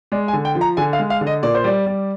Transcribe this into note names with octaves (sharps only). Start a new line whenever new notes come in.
G#3 D5
G#5
D3
G5
F3
A#5
D3 G#5
F5
G#3
F5
D3
D#5
A#2 D5
C5
G3 D5
G3